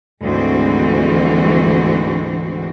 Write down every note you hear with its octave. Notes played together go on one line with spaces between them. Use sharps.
D2 G#2 E3 F3 C4 F#4